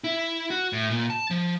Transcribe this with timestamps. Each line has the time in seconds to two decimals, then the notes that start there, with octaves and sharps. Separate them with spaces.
0.04 E4
0.50 F#4
0.73 A2
0.90 A#2
1.10 A5
1.31 F3